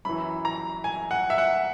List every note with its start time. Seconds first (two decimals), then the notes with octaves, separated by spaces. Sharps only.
0.05 F#2 E3 B5
0.45 A#5
0.84 G#5
1.11 F#5
1.30 E5
1.38 F#5